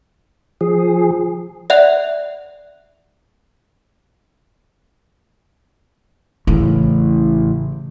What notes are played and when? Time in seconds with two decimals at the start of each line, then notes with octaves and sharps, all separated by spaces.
0.61 F3 G#4
1.70 D5 E5 F#5 F#6 F7
6.47 A1 A2 C#3 E3